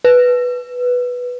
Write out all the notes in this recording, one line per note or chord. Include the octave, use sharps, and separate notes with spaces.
B4